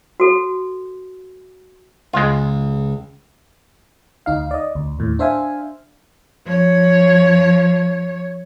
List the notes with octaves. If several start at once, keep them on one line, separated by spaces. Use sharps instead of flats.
F#4 A4
C#2 G#3 F4
D2 D#4 F5
D5 D#5
D2
D#2 A2
D4 C5 E5 F5 G#5
F3 C#5